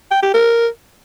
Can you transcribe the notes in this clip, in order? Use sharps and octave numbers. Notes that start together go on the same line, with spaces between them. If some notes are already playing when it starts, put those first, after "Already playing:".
G5
G4
A#4